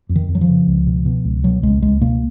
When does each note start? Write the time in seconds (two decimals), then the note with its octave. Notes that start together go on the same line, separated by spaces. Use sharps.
0.09 F2
0.16 D#3
0.29 F2
0.35 F#3
0.41 F3
0.48 C#3
0.67 C#2
0.87 B2
1.05 B2
1.25 C#2
1.44 B2 F#3
1.63 C#2 G#3
1.82 C#2 G#3
2.02 B2 A#3